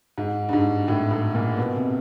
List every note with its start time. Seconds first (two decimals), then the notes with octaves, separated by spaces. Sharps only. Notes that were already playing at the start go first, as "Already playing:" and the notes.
0.18 G#2
0.49 G2
0.53 G#2
0.88 A2
1.11 A2
1.35 A#2
1.58 B2
1.75 C3